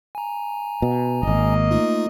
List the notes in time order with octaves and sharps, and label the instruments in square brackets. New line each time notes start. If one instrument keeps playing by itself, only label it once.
[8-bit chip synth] G#5 A#5
[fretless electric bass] B2
[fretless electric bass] D#1 G#1 [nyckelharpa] A#3 D#5
[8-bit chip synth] A3 D#4 F4